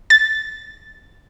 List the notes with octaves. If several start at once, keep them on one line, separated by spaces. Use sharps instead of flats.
A6